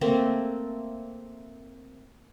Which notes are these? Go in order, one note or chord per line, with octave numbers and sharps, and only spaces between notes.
A3 A#3 C4